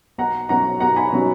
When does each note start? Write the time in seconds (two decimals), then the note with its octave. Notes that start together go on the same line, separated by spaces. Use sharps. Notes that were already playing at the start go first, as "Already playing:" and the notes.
0.18 B1 F#5 A#5
0.49 B2 F#3 C#4 F#5 A#5
0.80 B1 F#5 A#5
0.96 G#5 B5
1.12 B2 F#3 C#4